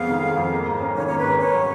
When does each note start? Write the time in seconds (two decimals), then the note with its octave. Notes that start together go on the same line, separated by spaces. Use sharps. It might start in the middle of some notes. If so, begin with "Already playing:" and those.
Already playing: F2 G#3 B3 F5
0.09 D#3
0.23 G#3
0.37 F2
0.52 A#3
0.66 G#2
0.81 C#4
0.95 D#3 C#5
1.07 A#3 C#5
1.18 B4
1.24 G#2
1.39 C#4 C#5
1.54 F#3